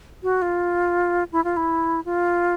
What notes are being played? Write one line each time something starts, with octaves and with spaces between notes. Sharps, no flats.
F#4
F4
E4
F4
E4
F4